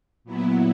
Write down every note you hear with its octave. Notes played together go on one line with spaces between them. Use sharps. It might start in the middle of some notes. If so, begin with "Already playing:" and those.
A#2 F#3 B3 E4